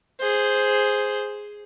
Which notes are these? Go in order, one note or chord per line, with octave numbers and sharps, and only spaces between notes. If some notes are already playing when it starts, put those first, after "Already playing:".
G#4 C5